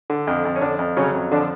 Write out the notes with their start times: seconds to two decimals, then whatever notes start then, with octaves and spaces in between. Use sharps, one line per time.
0.10 D3
0.27 F2
0.45 F2
0.56 C#4
0.62 F2 D3 D4
0.79 F2
0.97 C#3 F#3 C#4
1.15 F2
1.31 D3 F3 D4